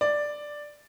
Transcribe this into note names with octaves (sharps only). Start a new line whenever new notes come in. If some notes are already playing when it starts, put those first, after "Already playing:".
D5